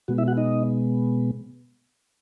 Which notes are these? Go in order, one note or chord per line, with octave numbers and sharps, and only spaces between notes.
B2 G#3 B3 F#4
E4 E5
F#4 F#5
D#4 D#5